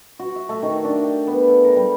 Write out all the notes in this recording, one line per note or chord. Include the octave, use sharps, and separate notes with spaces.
F#4
E5
A3
D#3
D4
G5
B3
A4
A#4
G3